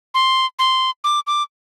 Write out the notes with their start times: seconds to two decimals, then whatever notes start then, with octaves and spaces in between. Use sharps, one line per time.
0.14 C6
0.59 C6
1.04 D6
1.27 D6